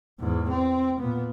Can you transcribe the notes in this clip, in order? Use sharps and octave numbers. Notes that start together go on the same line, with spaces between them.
E2 G#2
C4
A#2 B3